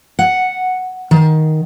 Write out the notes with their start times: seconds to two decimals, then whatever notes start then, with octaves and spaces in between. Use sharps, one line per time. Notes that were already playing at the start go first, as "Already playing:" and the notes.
0.19 F#5
1.11 D#3